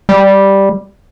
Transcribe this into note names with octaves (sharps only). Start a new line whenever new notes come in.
G3